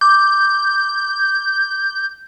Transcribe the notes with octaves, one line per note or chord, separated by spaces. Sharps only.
D6 G6